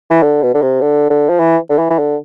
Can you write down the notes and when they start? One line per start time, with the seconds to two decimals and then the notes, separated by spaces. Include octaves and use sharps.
0.11 E3
0.23 D3
0.43 B2
0.54 D3
0.62 C3
0.81 D3
1.10 D3
1.29 F3
1.39 E3
1.70 D3
1.78 E3
1.90 E3
1.99 D3